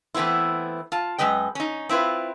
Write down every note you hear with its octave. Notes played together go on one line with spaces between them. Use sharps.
E3 A3 B3 C4 E4
F4 A5
F#2 G#3 B4 D#5 G5
C#4 D#4
C4 E4 F4 B4